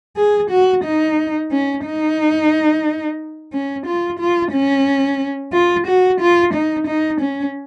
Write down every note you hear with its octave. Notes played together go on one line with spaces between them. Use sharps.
G#4
F#4
D#4
C#4
D#4
C#4
F4
F4
C#4
F4
F#4
F4
D#4
D#4
C#4